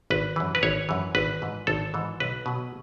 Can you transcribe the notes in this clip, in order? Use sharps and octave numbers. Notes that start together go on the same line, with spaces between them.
G#1 B4
F#2 E3
B4
G#1 C#5
F#2 E3
G#1 B4
G#2 E3
G#1 A4
G#2 E3
B1 B4
B2 F#3